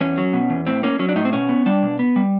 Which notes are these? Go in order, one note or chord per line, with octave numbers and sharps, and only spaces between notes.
E2 C#4
F#3
B2
E2
A2 C4
A#3 C#4
F#3 C#4
D4
A2 D#4
C4
B2 C#4
B3
G3 D4
B2
B3
G3